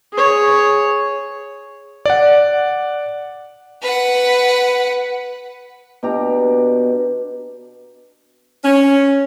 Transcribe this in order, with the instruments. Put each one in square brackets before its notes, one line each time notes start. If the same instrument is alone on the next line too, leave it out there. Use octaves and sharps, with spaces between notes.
[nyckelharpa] G#4 C#5
[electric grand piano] D5 F#5
[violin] B4 F#5
[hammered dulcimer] B2 D4 G4 A#5
[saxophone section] C#4